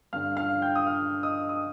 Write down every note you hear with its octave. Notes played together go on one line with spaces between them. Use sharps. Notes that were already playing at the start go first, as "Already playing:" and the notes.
G2 D3 F5 F6
F5 F6
G5 G6
D#6
F5 F6
D#5 D#6
D#6